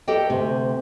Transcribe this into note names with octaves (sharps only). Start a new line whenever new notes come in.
G4 A4 A#4 D5 D#5 G5
D2 C3